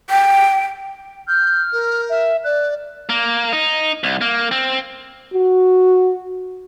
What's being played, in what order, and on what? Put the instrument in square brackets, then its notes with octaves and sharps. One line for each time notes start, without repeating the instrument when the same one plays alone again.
[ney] G5
[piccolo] F6 [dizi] G6
[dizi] A#4
[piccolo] E5
[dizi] D5 [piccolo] F#6
[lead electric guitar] A#3
D#4
C2
A#3
C4
[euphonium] F#4